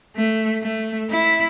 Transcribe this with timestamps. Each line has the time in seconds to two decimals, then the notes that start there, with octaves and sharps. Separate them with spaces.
0.16 A3
0.63 A3
1.11 E4